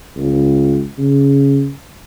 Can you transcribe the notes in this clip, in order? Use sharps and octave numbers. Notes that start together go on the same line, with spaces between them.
C#2
C#3